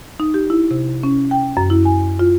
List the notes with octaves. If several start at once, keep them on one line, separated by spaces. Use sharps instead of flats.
D#4
G4
E4
C3
C#4
G5
F#2
E4
G#5
F4